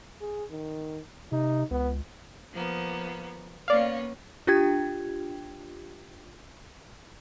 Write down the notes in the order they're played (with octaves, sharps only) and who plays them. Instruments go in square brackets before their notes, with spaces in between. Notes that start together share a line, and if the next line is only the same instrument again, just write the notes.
[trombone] G#4
D#3
[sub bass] C3 [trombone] D#4
[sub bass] C#2 [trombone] B3
[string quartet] F3 A#3 B3
[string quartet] A#3 B3 C#4 [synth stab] D5 F5
[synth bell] D4 F4 G4 G5 G#6